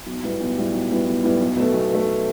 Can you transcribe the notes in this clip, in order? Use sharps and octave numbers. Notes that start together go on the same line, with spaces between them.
B1
A2 G3 B3
B1
A2 G3 B3
B1
A2 G3 B3
B1
A2 G3 B3
B1
B2 A3
B1
B2 A3